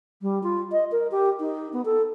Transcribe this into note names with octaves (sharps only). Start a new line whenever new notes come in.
G3
F4
D#5
A#4
G4
D#4
B3
A4